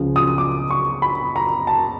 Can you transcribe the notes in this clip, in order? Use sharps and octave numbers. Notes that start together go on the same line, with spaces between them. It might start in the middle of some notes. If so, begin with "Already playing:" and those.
Already playing: C#2 C#3 F3
D#6
D6
C#6
B5
A#5
A5